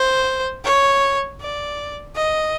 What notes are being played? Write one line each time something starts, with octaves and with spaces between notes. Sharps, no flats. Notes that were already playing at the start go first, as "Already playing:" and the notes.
Already playing: C5
C#5
D5
D#5